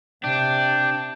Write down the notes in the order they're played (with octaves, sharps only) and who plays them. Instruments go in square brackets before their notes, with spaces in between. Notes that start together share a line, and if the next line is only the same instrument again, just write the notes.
[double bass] C3 [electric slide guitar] D4 [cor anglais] G5